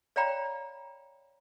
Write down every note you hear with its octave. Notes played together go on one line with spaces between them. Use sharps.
C#5 D5 F5 G5 A#5 B5